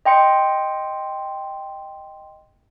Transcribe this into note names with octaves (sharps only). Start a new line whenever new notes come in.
D#5 G5 C6 C#7